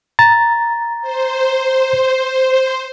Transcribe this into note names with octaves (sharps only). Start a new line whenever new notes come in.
A#5 A6
C5